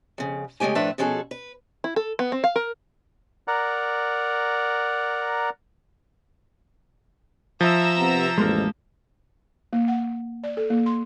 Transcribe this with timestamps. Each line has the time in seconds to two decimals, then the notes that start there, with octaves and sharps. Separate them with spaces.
0.18 F2 C#3
0.60 C#3 G#3 A3 G4 G#5
0.75 A2 F3 A3 D4 B4 E5
0.98 B2 F3 C#4 F#4 G#4 A4
1.31 B4
1.84 E4
1.96 A4
2.19 B3
2.32 C4
2.44 F5
2.56 A#4
3.48 A#4 D5 F#5 A#5
7.61 F3 E5 A#5 E6
7.98 C3 B3
8.38 A1 F2 G#3 A#3
9.73 A#3
9.88 F#5
10.44 D5
10.57 A4
10.70 A#3
10.86 C6